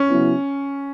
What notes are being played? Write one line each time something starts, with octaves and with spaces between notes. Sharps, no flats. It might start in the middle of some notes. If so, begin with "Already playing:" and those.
Already playing: C#4
C#3 F#3 B3 E4